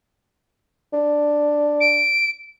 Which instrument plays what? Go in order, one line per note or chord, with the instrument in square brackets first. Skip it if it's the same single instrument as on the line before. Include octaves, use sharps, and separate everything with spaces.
[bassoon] D4
[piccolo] D7